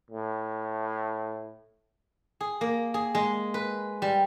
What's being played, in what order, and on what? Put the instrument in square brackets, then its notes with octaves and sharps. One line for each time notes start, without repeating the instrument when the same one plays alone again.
[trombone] A2
[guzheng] G#4
A#3
G#4
G#3
B4
G3